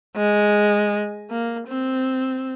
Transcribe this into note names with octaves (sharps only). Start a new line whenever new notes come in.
G#3
A#3
C4